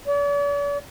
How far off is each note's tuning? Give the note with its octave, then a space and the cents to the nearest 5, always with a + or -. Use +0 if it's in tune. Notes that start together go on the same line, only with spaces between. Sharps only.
D5 -45